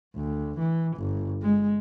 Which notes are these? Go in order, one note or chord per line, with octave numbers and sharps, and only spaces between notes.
D2
E3
G1
G#3